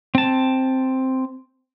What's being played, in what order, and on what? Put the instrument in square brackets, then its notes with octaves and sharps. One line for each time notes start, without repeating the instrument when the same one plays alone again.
[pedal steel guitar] C4 A5